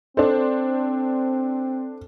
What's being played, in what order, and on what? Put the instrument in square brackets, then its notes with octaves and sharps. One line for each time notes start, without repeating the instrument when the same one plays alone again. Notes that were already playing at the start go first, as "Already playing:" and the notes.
[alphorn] C4 [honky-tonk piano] D4 C5 [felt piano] A4